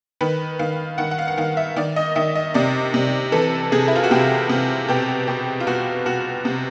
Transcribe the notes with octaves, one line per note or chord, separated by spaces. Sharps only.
D#3 B4
D#3 F5
D#3 F#5
F#5
F5
F#5
D#3 F5
E5
D#3 D5
D#5
D#3 E5
D#5
C3 D5
C3
E3 A4
C3 G#4
E4
F4
F#4
C3 G4
C3
B2 G4
B2 G4
F4
B2 F#4
B2 F#4
C3